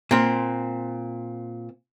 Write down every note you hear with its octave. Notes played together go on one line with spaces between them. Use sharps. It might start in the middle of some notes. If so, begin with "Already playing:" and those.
A#2 C4